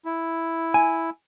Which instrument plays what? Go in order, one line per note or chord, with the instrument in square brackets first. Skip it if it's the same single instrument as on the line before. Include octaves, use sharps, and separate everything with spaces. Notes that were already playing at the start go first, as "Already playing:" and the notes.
[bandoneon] E4
[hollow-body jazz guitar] G#5